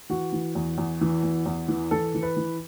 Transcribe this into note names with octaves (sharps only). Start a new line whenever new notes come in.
E3 F#4
E3
E2
E2
E3
E2
E2
E3
E3 A4
E3
B4
E3